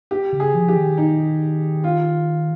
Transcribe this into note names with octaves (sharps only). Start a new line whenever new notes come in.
G4
C#3
G#4
F3
G4
D#3
D#4
F4